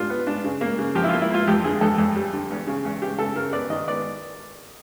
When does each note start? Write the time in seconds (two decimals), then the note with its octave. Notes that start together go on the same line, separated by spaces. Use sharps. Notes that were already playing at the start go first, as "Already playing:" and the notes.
Already playing: G3 D4 F4
0.10 B3
0.27 D4
0.44 C#3
0.61 A#3
0.78 C#3
0.95 F3 G4
1.04 E4
1.09 F4
1.13 A#3
1.22 E4
1.30 A#3 F4
1.47 F2 G4
1.64 D3 G#4
1.81 F2 A4
1.98 F2
2.15 G3
2.33 D3
2.50 E2
2.67 C#3
2.85 E2
3.02 C#3 G4
3.18 C#3 A4
3.36 C#3 A#4
3.53 B3 D5
3.70 D#3 D#5
3.88 B3 D5